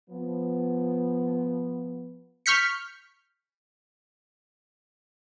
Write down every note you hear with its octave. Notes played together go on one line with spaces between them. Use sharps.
F3 B3
C#6 F6 G6 B6 C#7